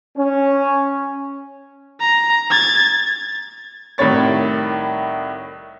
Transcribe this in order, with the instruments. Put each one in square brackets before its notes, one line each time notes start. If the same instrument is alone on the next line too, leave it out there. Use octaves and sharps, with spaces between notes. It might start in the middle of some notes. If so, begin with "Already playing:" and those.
[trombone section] C#4
[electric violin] A#5
G#6 A6
[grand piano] C2 A2 D#3 C#5 A6